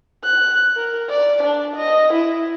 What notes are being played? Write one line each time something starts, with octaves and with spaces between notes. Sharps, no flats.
F#6
A#4
D5
D4
D#5
E4